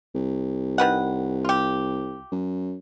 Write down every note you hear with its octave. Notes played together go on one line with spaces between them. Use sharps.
C2
D#3 B4 F#5
F4 G4
F#2